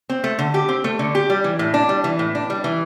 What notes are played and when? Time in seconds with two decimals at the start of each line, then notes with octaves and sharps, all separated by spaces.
0.10 C4
0.24 A3
0.39 D3
0.54 G4
0.69 C4
0.84 A3
0.99 D3
1.15 G4
1.30 G3
1.44 E3
1.59 A2
1.74 D4
1.89 G3
2.04 E3
2.19 A2
2.35 D4
2.50 G3
2.64 E3